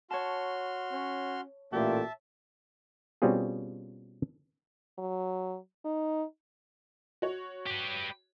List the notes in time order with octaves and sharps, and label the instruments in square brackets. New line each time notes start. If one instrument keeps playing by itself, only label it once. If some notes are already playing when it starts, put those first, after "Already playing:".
[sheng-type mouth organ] F#4 C6 F6 [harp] C#5 A5
[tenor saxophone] C#4
[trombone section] A1 A#2 A3 [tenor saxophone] G4 [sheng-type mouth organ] E5 A5
[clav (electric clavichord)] B2 G3 C4 C#4 F4 G#4
[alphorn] F#3
D#4
[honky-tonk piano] F#4 C#5
[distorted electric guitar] G4 B4